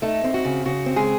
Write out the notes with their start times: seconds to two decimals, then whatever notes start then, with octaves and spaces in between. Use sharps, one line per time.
0.02 A3 D#4 A4
0.24 C4
0.34 F#4
0.44 C#3
0.65 C#3 F#4
0.86 C4
0.96 G#3 G#4